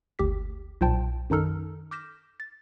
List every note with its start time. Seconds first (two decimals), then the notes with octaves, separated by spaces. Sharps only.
0.19 G1 D2 G4 B6
0.81 B1 A#2 C5 G5 A5
1.30 F#2 D#3 D#4 A4 F6
1.91 D6 F6 G6 A#6 B6 E7
2.40 A6